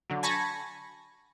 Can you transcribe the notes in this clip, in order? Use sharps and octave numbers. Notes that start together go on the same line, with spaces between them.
D3 F#3
G#5 A5 B5 C#6 G#6 A#6